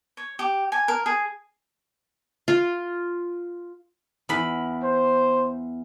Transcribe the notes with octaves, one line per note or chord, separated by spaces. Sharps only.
C#5
G4
G#5
A#4
G#4
F4
E2 B5
C5